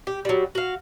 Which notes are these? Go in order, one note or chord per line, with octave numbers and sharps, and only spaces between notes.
G4
F#3 G3
F#4 F5